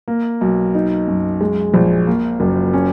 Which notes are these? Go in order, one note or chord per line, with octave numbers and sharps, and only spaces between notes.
A#3
B1
D#4
F#2
G#3
A#1
A#3
F#1
C#4